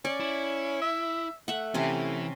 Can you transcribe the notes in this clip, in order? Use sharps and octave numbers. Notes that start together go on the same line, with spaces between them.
C#4 D5
E4
E5
A3 E5 F#5
C3 E3 C#4